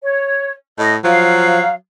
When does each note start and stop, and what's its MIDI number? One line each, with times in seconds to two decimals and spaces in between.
0.02 0.52 73
0.78 0.97 45
0.78 0.94 75
1.04 1.60 53
1.04 1.74 54
1.04 1.71 77